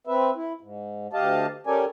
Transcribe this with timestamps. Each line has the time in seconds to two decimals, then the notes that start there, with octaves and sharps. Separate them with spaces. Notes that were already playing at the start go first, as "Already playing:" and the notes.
0.07 C4 B4 E5
0.36 E4
0.61 G#2
1.13 D2 G4 D#5 F5 A5
1.67 C#4 G4 A4 A#4 D5 G#5